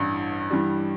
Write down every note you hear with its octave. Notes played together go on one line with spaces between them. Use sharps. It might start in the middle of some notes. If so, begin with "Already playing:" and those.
Already playing: A1 G2 E3
G2 E3 G3